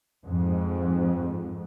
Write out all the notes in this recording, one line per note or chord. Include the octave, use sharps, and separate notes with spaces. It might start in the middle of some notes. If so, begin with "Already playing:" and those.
F2 G#2